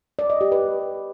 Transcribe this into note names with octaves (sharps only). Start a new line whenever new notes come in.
D5
D#5
G4
B4